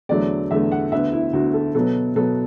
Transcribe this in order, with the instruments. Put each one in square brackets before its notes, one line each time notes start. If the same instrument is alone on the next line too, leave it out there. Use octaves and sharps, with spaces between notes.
[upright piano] E2 D3 F#3 A3 D5
E2 D3 F#3 A3 E5
F#5
D2 D3 B3 E5
E4
D2 D3 B3 F#4
A4
B2 F#3 B3 A4
B2 F#3 B3 A4